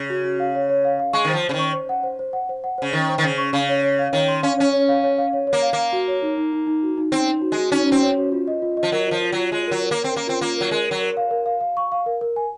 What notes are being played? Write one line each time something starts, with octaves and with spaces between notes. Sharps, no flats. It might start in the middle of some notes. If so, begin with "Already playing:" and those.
Already playing: C#3
F#4
F#4
F5
C#5
C#5
F5
F5
G#3 C#6
D#3
F3 C5
C5
C#3
D#3
C#6
C5
F#5
C5
C5
F#5
C5
F#5
C#3 C5
D#3 C#6
C5
D#3
C#3 C5
C#6
C#3 F5
C#5
C#5
F5
D#3 C#5
C6
C#4 F5
C#4 C#5
C#5
F5
C#5
F5
C#5
C#5
A#3
F5
A#3
F5
F#4
C#5
D#4
D#4
D#4
D#4
F#4
D#4
C4 D#4
D#4
F#4
G#3
F#4
C#4 D#4
F#4
C4
C#5
F#4
F4
D#5
F4
D#5
F3
F#3 A#4
F3 F4
F4
F#3 F4
G#3 F4
F#3 A#4
A#4
A#3
A#4
C4
A#3 A#4
C4 F4
A#3 F4
F#3 A#4
G#3 A#4
A#4
F#3
A#4
F5
A#4
F5
F5
C#6
F5
A#4
A#4
G#5